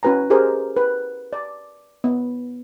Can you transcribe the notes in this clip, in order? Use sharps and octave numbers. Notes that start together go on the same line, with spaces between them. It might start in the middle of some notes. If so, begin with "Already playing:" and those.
C#4 F#4 B4 G#5 A#5
G4 G#4 A#4 C5
B4
D5
B3